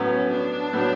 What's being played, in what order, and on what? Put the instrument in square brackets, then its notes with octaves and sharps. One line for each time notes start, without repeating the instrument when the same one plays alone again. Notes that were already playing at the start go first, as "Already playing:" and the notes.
Already playing: [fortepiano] A2 F#3 B3 [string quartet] C#4
[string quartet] D4
[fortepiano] A2 F#3 B3